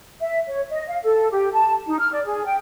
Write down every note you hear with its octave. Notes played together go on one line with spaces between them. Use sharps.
E5
C#5
D#5
F5
A4
G4
A5
D#4
F6
D5
G#4
G5